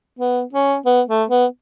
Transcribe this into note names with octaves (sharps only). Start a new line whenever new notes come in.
B3
C#4
B3
A3
B3